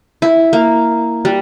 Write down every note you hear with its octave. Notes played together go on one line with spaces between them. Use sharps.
E4
A#3
G3